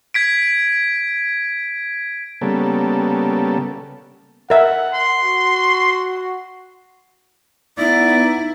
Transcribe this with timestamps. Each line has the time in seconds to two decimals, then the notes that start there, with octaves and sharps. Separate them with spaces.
0.14 G#6 B6 D7
2.42 C#3 G3 A#3 B3 A4
4.50 A#4 E5 F#5
4.94 C6
5.23 F#4
7.78 B3 D#4 E4 D5